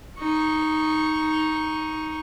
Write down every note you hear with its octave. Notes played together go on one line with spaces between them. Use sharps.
D#4 C#6